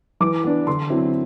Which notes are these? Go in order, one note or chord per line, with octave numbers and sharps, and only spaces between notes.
E3 D6
B3 D4
D3 C6
F#3 C4 E4